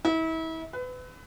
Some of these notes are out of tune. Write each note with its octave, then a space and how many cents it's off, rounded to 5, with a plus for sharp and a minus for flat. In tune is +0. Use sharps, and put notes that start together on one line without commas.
E4 -35
B4 +30